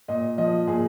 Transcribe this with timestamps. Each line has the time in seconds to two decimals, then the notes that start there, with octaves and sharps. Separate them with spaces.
0.08 A#2 D#5
0.38 F3 D#5
0.67 A#2 G#4